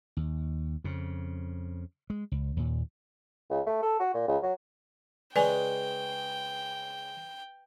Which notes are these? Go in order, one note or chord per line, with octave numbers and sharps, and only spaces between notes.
D#2
F2 C#3
G#3
C#2
D#2 A#2
C#2
A3
A4
F#4
A#2
C#2
F#3
C#3 G#3 B4 D5 G5 G#5